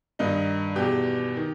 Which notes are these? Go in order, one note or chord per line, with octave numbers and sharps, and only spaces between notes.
G2 D#3 D#4
E2 B2 G4
D#3